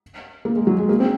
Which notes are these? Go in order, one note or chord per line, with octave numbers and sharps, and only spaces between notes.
A#3
G#3
F#3
G#3
A#3
C4